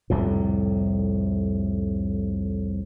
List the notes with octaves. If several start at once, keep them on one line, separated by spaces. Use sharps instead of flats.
C2 F2 A2